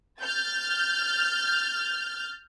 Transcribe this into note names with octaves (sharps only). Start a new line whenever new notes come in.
F6 G6 A6